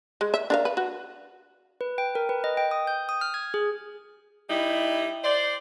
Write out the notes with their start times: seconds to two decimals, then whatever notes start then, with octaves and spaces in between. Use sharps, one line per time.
0.21 G#3
0.34 E5
0.50 D4 A#4 F5
0.65 B4
0.77 F#4
1.81 B4
1.98 G5
2.15 A#4
2.29 B4
2.44 D#5
2.57 G5
2.71 D#6
2.87 G6
3.09 D#6
3.21 F6
3.34 G#6
3.54 G#4
4.50 G3 D#4 E4 G4
5.24 C5 D5